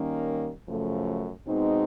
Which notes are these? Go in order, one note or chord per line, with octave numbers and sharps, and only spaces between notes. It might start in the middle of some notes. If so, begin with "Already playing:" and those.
Already playing: D#3 G3 A#3 C#4
F#2 C#3 F3 A3
B2 G#3 C4 D#4